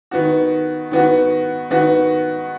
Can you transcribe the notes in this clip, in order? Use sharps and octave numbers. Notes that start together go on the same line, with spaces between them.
D#3 B3 F#4
D#3 B3 F#4
D#3 B3 F#4